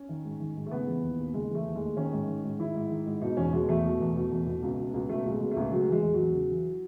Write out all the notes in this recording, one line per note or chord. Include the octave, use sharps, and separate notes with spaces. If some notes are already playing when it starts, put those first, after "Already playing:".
Already playing: C#4
D#3
G#2
D#3
G#2
A3
C#3 B3
E3
D#2
D#2
C#3 G#3
E3
A3
D#2
G#3
D#2
D#3 C#4
G#2
D#3
G#2
D#3 E4
G#2
D#3
G#2
B2 D#4
E2 C#4
B2 G#3
E2 A3
B2
E2
B2
E2
B2
C#2
B2
C#2
B2 A3
C#2 G#3
B2
A3
C#2
C#3 F#3
E3 G#3
E2
E2 F#3
C#3
E3